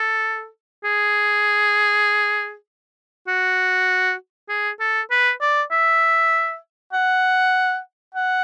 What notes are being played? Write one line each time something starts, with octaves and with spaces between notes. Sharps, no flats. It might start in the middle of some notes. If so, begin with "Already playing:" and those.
Already playing: A4
G#4
F#4
G#4
A4
B4
D5
E5
F#5
F#5